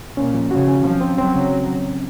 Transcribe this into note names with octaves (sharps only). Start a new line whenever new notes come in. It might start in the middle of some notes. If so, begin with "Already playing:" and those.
A#2 C#4
F3
C#3 F#4
C#4
F3 C4
C4
F#3 C4
C#3